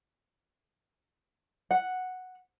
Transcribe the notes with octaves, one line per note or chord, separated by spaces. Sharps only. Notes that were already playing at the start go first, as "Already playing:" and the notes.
F#5